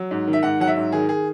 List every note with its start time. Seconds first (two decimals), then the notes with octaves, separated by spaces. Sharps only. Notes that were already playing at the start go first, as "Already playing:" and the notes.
Already playing: F#3
0.11 G#2
0.27 D#3
0.33 E5
0.43 G#2 F#5
0.60 F#3 F#5
0.67 E5
0.77 G#2
0.92 D#3 G#4
1.09 G#4